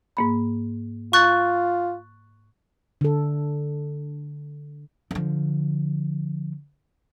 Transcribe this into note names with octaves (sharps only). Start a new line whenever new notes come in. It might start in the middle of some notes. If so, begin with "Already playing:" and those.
G#2 A#3 B5
F4 C#6 F#6 A6
D3 A4
D3 F3